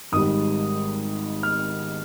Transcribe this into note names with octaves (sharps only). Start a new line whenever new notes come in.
G#1 G#2 G3 D#6
F6